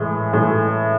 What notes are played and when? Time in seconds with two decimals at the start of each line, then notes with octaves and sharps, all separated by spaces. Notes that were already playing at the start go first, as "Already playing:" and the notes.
Already playing: A2 E3 G#3
0.33 A2 E3 G#3